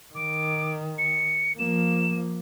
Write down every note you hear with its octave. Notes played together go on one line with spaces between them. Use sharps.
D#3 D6
C#7
F3 A#3 E7